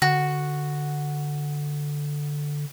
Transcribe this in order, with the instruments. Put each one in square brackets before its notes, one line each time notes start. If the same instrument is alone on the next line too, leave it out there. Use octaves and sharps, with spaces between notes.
[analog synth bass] D3 [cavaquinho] F#4